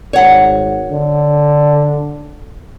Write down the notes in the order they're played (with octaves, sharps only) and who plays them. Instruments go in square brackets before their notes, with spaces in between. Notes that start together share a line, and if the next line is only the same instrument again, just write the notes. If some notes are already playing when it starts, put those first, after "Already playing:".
[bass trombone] G#1 [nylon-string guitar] C#5 F#5
[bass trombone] D3